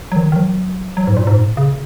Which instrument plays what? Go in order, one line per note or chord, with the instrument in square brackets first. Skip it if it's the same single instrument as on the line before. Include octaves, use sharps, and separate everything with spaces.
[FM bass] F#3
D#3
D#3
F#3
F#3
G#2
A#2
G#2
A#2
C#3